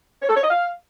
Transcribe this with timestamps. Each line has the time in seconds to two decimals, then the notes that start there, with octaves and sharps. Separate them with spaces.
0.22 C#5
0.29 A4
0.36 C#5
0.43 D#5
0.50 F5